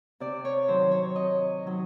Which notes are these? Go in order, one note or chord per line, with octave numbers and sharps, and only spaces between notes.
C3 D5
C#5
D#3 F#3 C5
C#5
C3 D#5
D#3 F#3